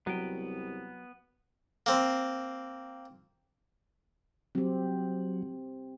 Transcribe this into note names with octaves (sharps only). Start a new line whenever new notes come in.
C2 F#3 B3 G5
A#3 C4
F#3 C4 G4